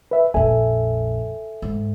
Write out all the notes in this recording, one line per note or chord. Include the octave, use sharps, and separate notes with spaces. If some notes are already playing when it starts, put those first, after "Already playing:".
B4 E5
A#1 F2 A4 E5 G#5
G#2